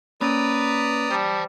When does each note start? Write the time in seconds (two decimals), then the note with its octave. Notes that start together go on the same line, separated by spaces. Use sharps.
0.21 A#3 C#4 B4 C#5 D5 A#5 D#6
1.11 G3 C5 A5